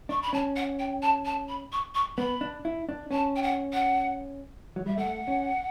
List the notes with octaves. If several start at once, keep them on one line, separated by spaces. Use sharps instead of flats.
D4 C#6
B5
C#4 A5
F#5
G5
A5
A5
B5
C#6
C#6
B3 B5
D4
E4
D4
C#4 A5
G5
F#5
F#5
F#3
G3 E5
A3 F#5
C#4